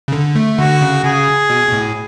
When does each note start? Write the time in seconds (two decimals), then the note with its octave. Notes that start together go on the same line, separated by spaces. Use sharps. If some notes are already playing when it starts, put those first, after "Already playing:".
0.08 C#3
0.12 D3
0.35 A3
0.58 D3 F#4
0.81 C#3
1.04 C#3 G#4
1.50 B2
1.67 B2
1.72 A2